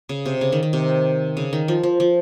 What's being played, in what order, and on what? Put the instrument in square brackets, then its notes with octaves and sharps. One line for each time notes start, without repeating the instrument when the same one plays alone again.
[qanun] C#3
C3
C#3
D#3
D#3
C3
C#3
D#3
F3
F3
F3